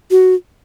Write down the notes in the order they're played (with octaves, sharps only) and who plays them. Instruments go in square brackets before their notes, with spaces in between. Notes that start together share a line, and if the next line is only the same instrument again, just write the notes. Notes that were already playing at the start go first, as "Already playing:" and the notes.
[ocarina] F#4